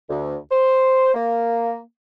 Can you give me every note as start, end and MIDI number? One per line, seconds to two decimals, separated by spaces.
0.09 0.36 38
0.51 1.13 72
1.14 1.80 58